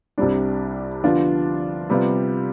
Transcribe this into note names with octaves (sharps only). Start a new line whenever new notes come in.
C2 C3 G3 D4
D3 F3 B3 D4 F4
C3 G3 B3 F4